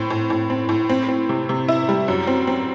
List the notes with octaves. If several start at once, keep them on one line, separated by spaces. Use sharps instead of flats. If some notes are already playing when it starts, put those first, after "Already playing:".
Already playing: A2 C4
A2
A2
C4
A2
C4
C4
C3
C3
E4
G3
F#2
C4
C4